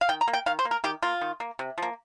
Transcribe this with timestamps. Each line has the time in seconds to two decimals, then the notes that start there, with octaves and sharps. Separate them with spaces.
0.01 F5
0.09 D#3 G5
0.21 A#5
0.28 A#3
0.33 G5
0.46 D#3 F5
0.59 C5
0.65 A#3
0.71 A#4
0.84 D#3 G4
1.03 A#3 F4
1.21 D#3
1.40 A#3
1.59 C3
1.78 F3 A#3